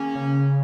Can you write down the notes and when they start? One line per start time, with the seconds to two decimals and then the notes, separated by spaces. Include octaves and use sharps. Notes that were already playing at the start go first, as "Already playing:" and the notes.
Already playing: D#3 A#3 C#4 G#4
0.15 C#3